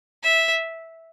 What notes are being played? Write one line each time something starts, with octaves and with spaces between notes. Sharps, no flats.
E5